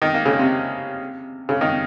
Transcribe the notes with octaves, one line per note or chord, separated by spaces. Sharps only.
D#3
A#3
C#3
C3
C#3
D#3